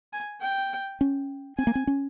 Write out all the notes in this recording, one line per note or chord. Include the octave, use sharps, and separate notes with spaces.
G#5
G5
C#4
C4 G#5
A#3
C4
C#4